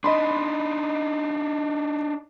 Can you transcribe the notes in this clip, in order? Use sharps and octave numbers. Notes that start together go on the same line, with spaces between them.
D4 D#4 D#5 B5 C6